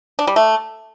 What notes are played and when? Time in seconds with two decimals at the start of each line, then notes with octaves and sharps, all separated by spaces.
0.19 D4
0.27 G3
0.36 A3